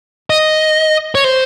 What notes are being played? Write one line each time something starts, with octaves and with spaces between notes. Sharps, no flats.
D#5
C#5
C5